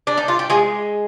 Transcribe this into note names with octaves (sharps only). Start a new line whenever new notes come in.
D4
D#4
F4
G4
G#3 F4 G#4